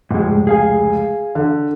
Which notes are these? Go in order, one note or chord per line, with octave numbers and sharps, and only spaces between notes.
F1 C#2 G#2 G#3
G#4 F5 G#5
D3